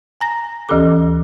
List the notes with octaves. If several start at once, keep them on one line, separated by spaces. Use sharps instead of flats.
G#5 A#5 A#6
D2 E3 C#4 G4 A4 D6